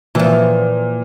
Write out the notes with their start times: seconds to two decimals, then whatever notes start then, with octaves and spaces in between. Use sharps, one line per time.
0.15 A#2 E3 F3